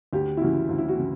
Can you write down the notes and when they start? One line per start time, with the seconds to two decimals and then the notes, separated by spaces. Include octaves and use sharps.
0.13 D2 G4
0.37 E4
0.41 C#3 E3 F#4
0.69 D2
0.78 E4
0.89 F#4
0.97 C#3 E3